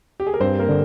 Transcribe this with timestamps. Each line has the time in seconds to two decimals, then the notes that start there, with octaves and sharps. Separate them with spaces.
0.20 G4
0.27 G#4
0.34 A#4
0.40 G2 C4 C5
0.59 A#3 A#4
0.69 D3